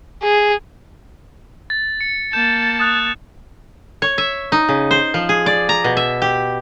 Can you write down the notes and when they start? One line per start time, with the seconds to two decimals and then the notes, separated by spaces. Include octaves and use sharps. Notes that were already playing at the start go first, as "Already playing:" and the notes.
0.23 G#4
1.70 A6
2.01 C#7
2.33 A#3 A5 G6 E7
2.80 D#6 F#6 F7
4.02 C#5
4.18 E5
4.52 D#4
4.69 C#3
4.91 C5
5.14 F3
5.29 G#4
5.46 D5
5.69 A#5
5.84 B2
5.97 E5
6.22 G4